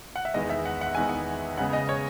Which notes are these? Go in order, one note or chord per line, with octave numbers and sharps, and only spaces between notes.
F#5
E5
E2 D#3 G#3 B3 D#5
E5
F#5
F#5
E2 D#3 G#3 B3 G#5
F#5
C#3 G#3 B3 F#5
D#5
C#5